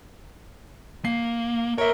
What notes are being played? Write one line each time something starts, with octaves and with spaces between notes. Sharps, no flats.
A#3 C7
A#4 B4 C#5 E5